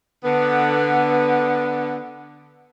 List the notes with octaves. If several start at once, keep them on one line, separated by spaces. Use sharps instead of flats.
D3 B3